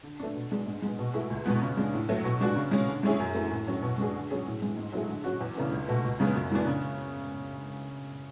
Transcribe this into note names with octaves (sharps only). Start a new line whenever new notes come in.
D3
A3 D4
B2
G#3 D4 G#4
G#2
G#3 B3
B2
A3 E4 G#4
C#2
B2 G#3 B3
C#3
G#3 D4
A2
F#3 A3
B2
G#3 D4 F#4
C#3
G#3 C#4
D3
G#3 C#4 E4 G#4
F#2
E3 A3
A2
F#3 C#4
B2
G#3 D4 G#4
D3
F#3 C#4 G#4
A2
E3 G#3
G#2
F#3 A3 E4 G#4
D3
F#3 C#4 F#4
E2
C#3 E3 A3 D4
C#2
B2 A3
C#2
C#3 G#3 B3
F#2
E3 G#3 B3 D4
C#3